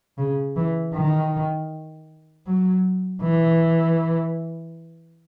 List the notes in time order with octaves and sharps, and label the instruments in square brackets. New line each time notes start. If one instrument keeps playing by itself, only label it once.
[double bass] C#3
E3
D#3
F#3
E3